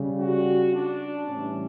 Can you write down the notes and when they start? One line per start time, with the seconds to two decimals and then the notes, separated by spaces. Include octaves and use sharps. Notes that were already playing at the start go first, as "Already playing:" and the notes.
Already playing: C#3 G3
0.19 F#4
0.74 D4
1.28 A2 E3 G3 C#4